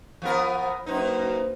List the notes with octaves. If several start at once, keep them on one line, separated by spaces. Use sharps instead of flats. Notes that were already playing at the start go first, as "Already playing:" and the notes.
F3 B3 A#4
F#2 A#3 D#4 B4 C5